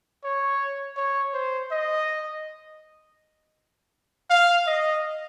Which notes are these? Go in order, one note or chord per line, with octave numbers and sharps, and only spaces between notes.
C#5
C#5
C5
D#5
F5
D#5